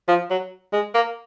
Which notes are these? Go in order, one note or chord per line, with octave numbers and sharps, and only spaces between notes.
F3
F#3
G#3
A#3